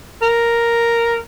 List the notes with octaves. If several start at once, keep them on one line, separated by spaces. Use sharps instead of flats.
A#4